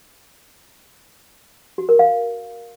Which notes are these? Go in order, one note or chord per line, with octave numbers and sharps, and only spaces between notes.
F#4
A#4
F5